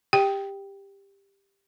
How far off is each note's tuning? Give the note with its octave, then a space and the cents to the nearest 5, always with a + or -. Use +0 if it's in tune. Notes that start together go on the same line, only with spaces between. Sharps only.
G4 +15 G5 +0